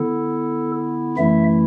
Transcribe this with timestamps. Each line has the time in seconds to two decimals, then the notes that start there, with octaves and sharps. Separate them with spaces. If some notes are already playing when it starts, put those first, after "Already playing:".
Already playing: D3 B3 E4 A4
1.17 F#2 E3 A3 E4 E5